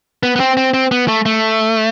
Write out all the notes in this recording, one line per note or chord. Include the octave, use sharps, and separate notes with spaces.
B3
B3
C4
C4
C4
B3
A3
A3